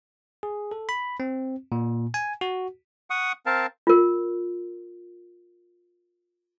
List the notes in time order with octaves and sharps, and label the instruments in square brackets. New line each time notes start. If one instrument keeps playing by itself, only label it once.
[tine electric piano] G#4
A4
B5
C4
A#2
G#5
F#4
[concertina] F#5 C#6 D#6
C4 A#4 F5 A5
[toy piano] F4 A#4